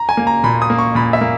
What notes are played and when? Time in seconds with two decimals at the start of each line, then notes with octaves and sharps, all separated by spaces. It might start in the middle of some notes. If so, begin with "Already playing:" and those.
Already playing: A#5
0.09 G#5
0.17 A#3
0.27 A#5
0.44 A#2 B5
0.62 D#6
0.70 A#3
0.78 C#6
0.95 A#2 B5
1.13 E5
1.21 A#3